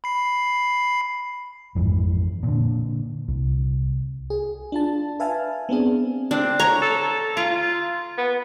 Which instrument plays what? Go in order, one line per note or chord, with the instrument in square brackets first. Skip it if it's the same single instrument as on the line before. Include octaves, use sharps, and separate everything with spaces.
[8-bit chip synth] B5 C7
[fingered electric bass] A1 F2 G#2 E3
A#2 D3
C2
[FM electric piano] G#4
D4 F4 A5
B4 E5 F5 G#5 A5 F6
B3 C4 D4 G#4
[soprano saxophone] C4 [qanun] D4
[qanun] C#5 A#5
[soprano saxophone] A4
[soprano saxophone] F4 [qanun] A#5
[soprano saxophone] B3